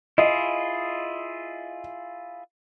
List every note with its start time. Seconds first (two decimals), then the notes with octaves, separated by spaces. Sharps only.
0.18 E4 F4 G#4 D#5